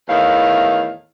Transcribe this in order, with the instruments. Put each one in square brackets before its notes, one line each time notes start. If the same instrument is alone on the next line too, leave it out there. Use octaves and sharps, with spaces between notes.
[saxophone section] E2 A2 D#3 E4 C#5 F5